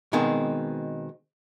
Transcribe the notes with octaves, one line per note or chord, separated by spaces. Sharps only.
B2 D#3 G#3 C4